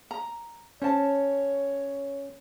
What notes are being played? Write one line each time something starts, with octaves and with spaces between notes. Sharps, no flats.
A#5
C#4 C5 C#5 A5